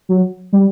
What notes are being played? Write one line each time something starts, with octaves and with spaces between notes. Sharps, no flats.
F#3
G3